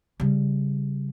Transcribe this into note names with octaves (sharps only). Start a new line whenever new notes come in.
C#3 G3